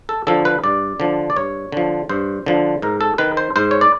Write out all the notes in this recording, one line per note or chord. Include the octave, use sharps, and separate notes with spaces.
A4
D3 F3 A4
B4
G2 D5
D3 F3
D5
G2 C#5
D3 F3
G2 C5
D3 F3
G#2 A#4
A4
D#3 B4
C5
G#2 C5
C#5
D5